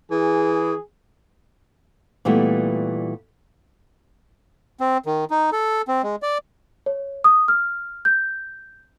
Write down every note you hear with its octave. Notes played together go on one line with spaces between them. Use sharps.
E3 G#4
A#2 E3 G3 A3 B3
C4
D#3
D#4
A4
C4
G#3
D5
C#5
D#6
F6
G6